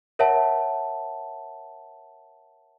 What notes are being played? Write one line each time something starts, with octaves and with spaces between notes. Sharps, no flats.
A#4 C#5 E5 F#5 A5